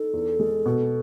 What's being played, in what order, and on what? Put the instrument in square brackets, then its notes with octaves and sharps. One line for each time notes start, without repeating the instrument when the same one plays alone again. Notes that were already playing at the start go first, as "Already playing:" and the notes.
Already playing: [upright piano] D#4 [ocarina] A4
[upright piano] E2
G#3
B2